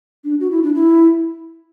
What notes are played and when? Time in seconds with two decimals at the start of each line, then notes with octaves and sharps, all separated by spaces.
0.24 D4
0.40 F#4
0.51 E4
0.63 D4
0.74 E4